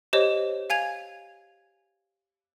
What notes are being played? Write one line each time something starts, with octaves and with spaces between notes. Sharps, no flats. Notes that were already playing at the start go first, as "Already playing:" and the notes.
G4 C5 C#5 D#5
F5 G#5 G#6 F7